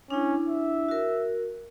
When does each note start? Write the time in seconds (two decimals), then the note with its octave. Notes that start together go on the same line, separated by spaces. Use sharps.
0.10 C#4 D4 E4
0.48 E5
0.89 F#4 A#4